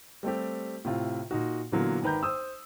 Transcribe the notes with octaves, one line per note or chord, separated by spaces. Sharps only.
G3 A3 C4 G4
A2 C3 F4
A#2 D#4 F#4
A#2 D3 E3 F#3 A#3 B3
G#1 D#3 B4 A#5 G6
C5 D#6 E6